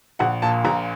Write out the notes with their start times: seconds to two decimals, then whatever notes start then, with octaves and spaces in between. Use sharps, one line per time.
0.19 A#1 F#5
0.42 A#2 A5
0.65 A#1 A#5